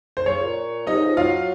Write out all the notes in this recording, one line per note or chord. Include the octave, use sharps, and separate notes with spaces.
C5
C#3 C#5
A#2
C3 D#4 D#5
C#3
F3
F#3 F4 F5